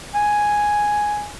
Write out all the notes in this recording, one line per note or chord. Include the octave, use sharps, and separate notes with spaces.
G#5